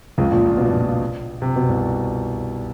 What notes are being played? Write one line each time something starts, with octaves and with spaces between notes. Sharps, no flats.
C#2 C#3
A#1 A#2
A#2
B2
A#1 A#2
C3
B2
C2 C3